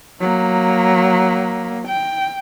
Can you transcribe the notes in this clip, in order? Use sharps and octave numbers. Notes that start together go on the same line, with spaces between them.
F#3 A#3
G5